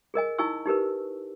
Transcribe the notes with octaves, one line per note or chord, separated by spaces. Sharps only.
G#4 A#4 D#5 G#5
D#4 E4 G#5 C#6 E6
D#4 G4 A#4 B4